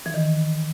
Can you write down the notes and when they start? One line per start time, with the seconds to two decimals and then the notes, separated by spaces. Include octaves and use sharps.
0.06 E3
0.14 D#3